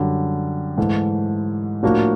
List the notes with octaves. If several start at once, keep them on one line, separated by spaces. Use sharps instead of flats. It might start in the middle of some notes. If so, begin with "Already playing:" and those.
Already playing: F#2 D3 G3
G#2 E3 A3
A2 F3 A#3 D4 F#4